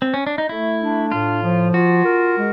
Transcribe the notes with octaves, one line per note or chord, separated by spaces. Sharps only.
C4
C#4
D4
D#4
A3 E4
D4
A2 F4
F3
F4 F#4
A#4
G#3